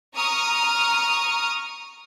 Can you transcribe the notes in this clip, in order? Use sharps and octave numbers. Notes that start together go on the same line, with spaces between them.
A#5 C#6 D#6 F6